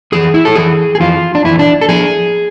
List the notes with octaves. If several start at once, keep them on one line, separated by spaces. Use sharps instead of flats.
F2 E3 G#4
E4
A4
F2 E3 G#4
G#4
F2 E3 F4
D4
F2 E3 E4
D4
A4
F3 G#4